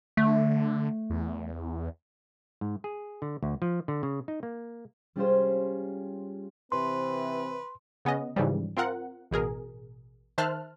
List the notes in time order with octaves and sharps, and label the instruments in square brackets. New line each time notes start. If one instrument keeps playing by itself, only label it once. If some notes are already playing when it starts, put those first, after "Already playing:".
[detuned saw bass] D3 [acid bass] A3
[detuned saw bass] E2
[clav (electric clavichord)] G#2
G#4
D3
D2
F3
D3
C#3
D#4
A#3
[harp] G3 C#4 F4 G4 G#4 C5
[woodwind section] C3 E3 [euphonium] C4 [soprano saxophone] B4 [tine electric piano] C6
[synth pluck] C#3 B3 C#4 D#5
G#2 C#3 E3 F3 G3
C4 F4 A#4 F#5
A1 B2 G#4 A#4
D#3 C5 E5 A5 F6 F#6